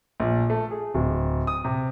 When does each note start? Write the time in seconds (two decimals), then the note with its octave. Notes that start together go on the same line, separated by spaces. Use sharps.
0.20 A#1
0.50 A3
0.71 G#4
0.94 D1
1.47 D#6
1.65 C3